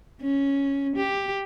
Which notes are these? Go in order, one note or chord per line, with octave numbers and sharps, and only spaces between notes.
C#4
G4